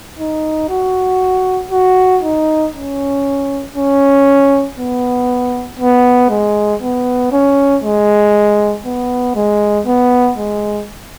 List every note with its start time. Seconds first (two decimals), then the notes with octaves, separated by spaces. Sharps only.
0.19 D#4
0.69 F#4
1.71 F#4
2.23 D#4
2.74 C#4
3.76 C#4
4.78 B3
5.79 B3
6.30 G#3
6.82 B3
7.32 C#4
7.84 G#3
8.85 B3
9.36 G#3
9.87 B3
10.38 G#3